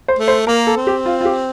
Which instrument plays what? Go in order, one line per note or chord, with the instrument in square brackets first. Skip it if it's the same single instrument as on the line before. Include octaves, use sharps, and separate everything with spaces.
[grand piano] C5
[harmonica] A3
[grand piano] C5
[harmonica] A#3 [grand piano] A#4
[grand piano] A4
[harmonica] C4
[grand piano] G4
F4
F4
G4